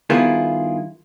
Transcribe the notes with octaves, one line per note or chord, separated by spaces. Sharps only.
G2 D#3 B3 E4 F4 G#4